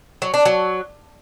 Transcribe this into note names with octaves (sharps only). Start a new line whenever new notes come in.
F#3
D4
F#3